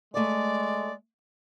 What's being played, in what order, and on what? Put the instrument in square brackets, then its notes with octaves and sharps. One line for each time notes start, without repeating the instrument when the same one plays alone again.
[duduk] G#3 [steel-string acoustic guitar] A3 C#5 [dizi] D5